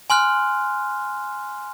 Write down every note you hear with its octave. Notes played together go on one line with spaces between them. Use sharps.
G#5 C6 F6 F#6